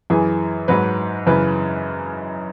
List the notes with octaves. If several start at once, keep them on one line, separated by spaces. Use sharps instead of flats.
F#2 E3 G#4
G#2 F#3 B4
F#2 C#3 E3 B4